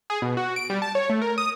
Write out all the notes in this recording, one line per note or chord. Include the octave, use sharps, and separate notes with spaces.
G#4
B2
F#4
D7
G3
A5
C#5
A3
A#4
D#6